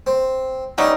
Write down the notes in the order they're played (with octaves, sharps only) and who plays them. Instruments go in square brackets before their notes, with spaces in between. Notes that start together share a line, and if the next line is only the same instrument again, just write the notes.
[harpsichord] C4
[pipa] G3 B3 D#4 [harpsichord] C#4 E4